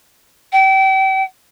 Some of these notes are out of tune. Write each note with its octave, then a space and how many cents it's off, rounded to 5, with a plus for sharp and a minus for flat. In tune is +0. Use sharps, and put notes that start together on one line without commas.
G5 -35